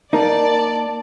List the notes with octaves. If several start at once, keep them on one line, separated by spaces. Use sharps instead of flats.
A#3 D#4 D5 A5